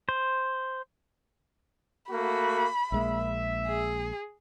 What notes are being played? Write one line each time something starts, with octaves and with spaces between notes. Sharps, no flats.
C5
A3 A#3 F#4 B5
A#1 G#3 A#3 E5
G#4